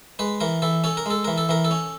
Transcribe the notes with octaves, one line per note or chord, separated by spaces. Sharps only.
G#3 B4
E3 A#4
E3 A4
C#4 A4
A#4
G#3 A4
E3 A#4
A4
E3 A#4
A4
C#4